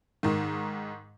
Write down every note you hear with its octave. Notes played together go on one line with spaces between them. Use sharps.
G#2 D#3